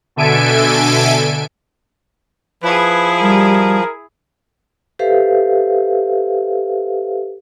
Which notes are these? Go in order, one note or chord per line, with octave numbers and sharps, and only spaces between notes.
B2 D3 A4 E5 G#5 D7
F3 E4 G#4 B4
G3 A#4
G4 A4 B4 C5 E5 F5